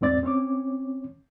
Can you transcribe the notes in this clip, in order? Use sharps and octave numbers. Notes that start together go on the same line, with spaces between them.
E2 G#2 C4 D5 A6
C4 C#4 C#5 D6